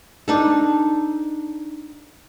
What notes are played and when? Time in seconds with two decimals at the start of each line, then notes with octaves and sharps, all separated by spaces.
0.28 D4 D#4 A4